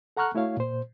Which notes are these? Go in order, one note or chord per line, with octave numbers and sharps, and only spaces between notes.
A4 F#5 A#5 C#6 F6 F#6
A3 E4 F#4 C#5 F5
A#2 C5